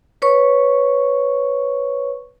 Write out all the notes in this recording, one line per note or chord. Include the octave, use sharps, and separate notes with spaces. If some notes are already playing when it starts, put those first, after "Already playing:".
B4 C#5 C#6